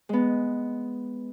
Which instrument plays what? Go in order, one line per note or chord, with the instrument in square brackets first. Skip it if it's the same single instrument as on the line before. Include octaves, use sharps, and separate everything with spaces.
[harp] G#3 B3